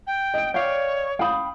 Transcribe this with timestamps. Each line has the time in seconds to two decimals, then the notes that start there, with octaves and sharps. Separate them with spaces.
0.07 G5
0.34 D#5 D7
0.54 C#5 D5 F5 G5
1.19 F5 G5 B5 D#6 G6